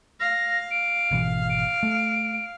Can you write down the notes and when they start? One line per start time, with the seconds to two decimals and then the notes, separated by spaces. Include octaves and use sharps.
0.20 F5 A#6
0.71 D7
1.11 G#1 B2 E3
1.50 D7
1.83 A3